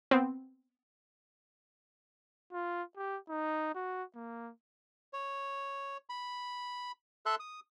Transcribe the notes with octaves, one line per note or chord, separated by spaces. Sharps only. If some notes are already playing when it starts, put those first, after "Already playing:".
B3 C4
F4
G4
D#4
F#4
A#3
C#5
B5
A4 E5 C6 F#6
D#6